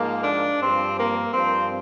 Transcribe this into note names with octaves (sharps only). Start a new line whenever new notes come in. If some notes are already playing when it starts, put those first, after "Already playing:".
Already playing: G#2 F3 A#3
D4
G2 F3 C4
A#3
G2 F3 C4